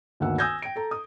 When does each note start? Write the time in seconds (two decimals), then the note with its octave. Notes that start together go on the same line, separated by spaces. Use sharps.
0.20 G1 D2 D#3 A#3 F#5 E6
0.38 G#5 D#6 E6 G6 G#6 A#6
0.62 G5 D7
0.76 A4 A#5
0.91 D#6